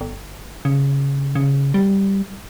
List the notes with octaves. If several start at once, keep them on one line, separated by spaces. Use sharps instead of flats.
G1
C#3
C#3
G3